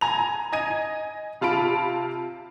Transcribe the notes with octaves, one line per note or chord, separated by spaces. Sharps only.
G#5 A#5 F7
D#5 G#5 G#6 D#7
C3 F4 A5 B5 D7